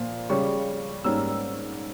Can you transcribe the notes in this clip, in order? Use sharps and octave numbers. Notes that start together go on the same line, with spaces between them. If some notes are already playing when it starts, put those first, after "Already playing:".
Already playing: A#2 F3 A#3
C#3 G3 C#4 C#6
G#2 G3 A#3 C#4 E6